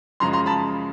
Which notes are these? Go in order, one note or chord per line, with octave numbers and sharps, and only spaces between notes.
F#2 C#3 F3 G#3 A#5 C6
A#5 C6
A5 B5